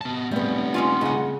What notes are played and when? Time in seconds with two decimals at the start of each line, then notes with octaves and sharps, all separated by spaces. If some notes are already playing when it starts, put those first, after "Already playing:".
0.01 B3 A5
0.31 G3 A3 B3 C4
0.74 G#3 C#4 F4
1.01 C#3 D#5 F#5